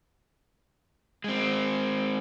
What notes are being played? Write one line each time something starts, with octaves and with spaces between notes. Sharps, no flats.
G#3 C4